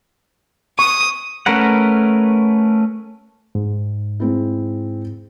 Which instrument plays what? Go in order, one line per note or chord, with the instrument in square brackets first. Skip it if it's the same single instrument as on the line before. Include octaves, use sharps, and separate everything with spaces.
[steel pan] C#6 [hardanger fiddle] D#6
[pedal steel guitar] A3 C#4 A#4 B4 F#5
[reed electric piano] G#2
[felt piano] G#3 C4 E4